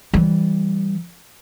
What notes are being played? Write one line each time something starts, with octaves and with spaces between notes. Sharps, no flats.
E3 G3